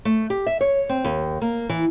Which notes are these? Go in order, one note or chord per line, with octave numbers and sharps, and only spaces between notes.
A3
G4
E5
C#5
C4
D#2
A#3
E3